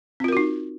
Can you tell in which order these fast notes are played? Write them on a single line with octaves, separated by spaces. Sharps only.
C4 F4 A#4 F#4 D#4